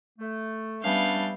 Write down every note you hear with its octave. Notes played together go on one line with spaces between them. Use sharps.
A3
G3 B3 C#4 D4 E5 F5 G6